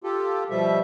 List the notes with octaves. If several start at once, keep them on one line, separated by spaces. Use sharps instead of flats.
F4 G4 A4
B2 F3 G3 E5